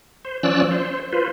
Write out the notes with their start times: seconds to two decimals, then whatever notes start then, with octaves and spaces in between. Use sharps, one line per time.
0.25 C5
0.43 F3 C#4 D5 E6 F#6
0.71 C5
1.12 F4 B4 C5